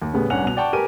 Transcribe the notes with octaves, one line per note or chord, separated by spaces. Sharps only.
D#2
A2 C#3 G3 B3
C2 C#4 D4 F#5 F#6 F7
B2 F7
D5 F#5 G5 A5 C#6
G4 A#4 B4 G#5 D#7